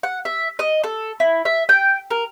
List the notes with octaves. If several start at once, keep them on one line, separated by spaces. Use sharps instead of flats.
F#5
E5
D#5
A4
E4
E5
G5
A#4